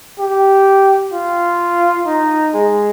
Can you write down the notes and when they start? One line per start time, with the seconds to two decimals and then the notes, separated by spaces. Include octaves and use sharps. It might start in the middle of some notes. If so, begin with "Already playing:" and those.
0.19 G4
1.14 F4
2.06 D#4
2.54 G#3